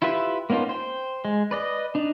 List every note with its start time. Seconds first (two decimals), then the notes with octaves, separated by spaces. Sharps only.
0.02 E4 F4 G4 B4 E5
0.50 A#3 B3 C#4 D#4 F4
0.69 C5 G5
1.25 G#3
1.51 B4 D5 D#5
1.95 D4 D#4